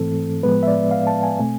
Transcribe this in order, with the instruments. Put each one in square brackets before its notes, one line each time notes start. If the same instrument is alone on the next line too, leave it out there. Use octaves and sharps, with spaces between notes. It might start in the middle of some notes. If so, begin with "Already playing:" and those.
Already playing: [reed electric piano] G#2 E3 A3 C4 A4
A2 F3 G#3 B3 B4
E5
D5
F5
A5
G#5
B2 A3 C4